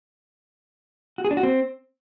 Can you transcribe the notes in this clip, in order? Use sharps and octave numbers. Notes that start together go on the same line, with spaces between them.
F#4
G#4
D4
F#4
C4